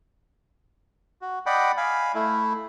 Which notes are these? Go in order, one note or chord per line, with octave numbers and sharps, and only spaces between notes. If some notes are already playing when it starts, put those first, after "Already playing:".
F#4
D5 D#5 F#5 G5 B5
F5 G#5 B5
A3 E4